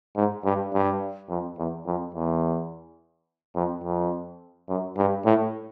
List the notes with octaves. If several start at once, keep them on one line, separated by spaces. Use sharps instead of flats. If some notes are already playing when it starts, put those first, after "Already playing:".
G#2
G2
G2
F2
E2
F2
E2
F2
F2
F#2
G2
A2